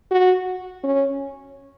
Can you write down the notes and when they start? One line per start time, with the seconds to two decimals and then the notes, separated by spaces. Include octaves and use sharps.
0.11 F#4
0.84 C#4